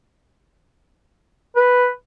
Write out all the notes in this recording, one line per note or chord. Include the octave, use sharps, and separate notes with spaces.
B4